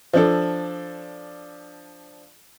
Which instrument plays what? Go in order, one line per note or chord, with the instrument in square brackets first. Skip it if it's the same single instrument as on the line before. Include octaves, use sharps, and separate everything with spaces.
[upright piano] F3 D4 A4